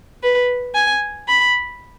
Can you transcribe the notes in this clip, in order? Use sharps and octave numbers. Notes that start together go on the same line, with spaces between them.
B4
G#5
B5